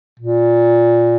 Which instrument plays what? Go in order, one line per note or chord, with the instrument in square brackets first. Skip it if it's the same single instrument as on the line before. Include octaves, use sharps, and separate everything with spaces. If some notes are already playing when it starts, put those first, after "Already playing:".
[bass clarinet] A#2